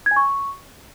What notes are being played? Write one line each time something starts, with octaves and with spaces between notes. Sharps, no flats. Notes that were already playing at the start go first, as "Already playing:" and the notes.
G#6
G#5
C#6